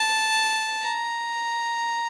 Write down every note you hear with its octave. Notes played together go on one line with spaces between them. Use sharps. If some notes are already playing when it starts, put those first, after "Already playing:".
Already playing: A5
A#5